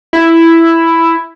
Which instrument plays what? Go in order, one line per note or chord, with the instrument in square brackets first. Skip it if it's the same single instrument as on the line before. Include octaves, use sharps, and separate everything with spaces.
[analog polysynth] E4